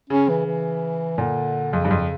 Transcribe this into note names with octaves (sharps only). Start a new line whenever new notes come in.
C#3 C#4
E3
E3
A#2 D3
F2 C#3
G2
F2